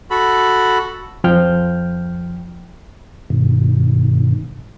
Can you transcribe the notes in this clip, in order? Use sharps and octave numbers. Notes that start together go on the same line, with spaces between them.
F#4 A4 B5
F2 F3 G5 F6 G6
G2 B2 D#3